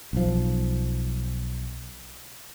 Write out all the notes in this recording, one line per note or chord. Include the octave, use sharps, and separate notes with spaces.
B1 F3